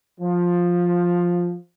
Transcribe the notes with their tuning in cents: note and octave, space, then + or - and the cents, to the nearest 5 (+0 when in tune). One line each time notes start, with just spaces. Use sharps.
F3 +10